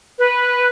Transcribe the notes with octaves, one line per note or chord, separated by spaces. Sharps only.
B4